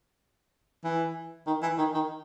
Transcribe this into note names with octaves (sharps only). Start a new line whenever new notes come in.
E3
D#3
E3
D#3
D#3